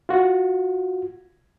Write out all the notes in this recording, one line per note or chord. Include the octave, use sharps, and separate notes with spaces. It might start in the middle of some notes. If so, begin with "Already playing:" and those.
F4 F#4